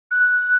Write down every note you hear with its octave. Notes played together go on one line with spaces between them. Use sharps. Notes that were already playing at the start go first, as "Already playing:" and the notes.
F#6